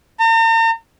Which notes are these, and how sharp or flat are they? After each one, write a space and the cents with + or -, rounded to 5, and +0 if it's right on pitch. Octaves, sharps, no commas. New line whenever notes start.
A#5 -45